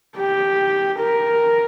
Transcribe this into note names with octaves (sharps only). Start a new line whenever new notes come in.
G4
A#4